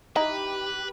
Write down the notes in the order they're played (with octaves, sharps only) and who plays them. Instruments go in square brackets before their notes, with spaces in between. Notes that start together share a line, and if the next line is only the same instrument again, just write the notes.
[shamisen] D#4 E4 [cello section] G4 [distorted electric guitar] B4 [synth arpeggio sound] D#5